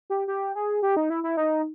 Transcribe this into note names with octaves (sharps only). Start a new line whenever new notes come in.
G4
G4
G#4
G4
D#4
E4
E4
D#4